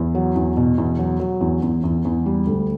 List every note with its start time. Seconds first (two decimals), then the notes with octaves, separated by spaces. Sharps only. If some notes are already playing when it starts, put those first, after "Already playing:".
Already playing: E2
0.15 F#3
0.36 E2
0.57 B2
0.78 E2
0.99 F#3
1.20 F#3
1.41 E2
1.62 E2
1.84 E2
2.05 E2
2.26 G3
2.47 D2